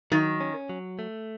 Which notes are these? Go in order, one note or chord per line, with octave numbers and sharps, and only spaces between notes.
D#3 F#3
C#4
F#3
A3